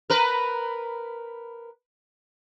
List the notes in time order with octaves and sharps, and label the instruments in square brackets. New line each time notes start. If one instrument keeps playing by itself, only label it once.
[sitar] A#4 B4